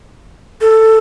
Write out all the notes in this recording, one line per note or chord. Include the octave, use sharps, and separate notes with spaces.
A4